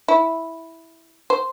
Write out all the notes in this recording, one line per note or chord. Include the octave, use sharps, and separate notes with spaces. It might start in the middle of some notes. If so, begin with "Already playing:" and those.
E4
C5